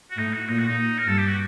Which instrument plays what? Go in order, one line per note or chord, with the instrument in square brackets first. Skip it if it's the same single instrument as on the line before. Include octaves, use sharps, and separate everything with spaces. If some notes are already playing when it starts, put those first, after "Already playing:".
[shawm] F#4
[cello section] A2 [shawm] D#4
[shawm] F#4
[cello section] A#2 [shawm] D#4
[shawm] F#4
D#4
A#4
[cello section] G2 [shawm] A4
[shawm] G4
F#4